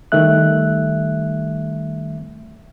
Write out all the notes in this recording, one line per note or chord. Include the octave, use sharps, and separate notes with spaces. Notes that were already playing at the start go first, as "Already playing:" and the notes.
D#3 G3 A3 E5 F#6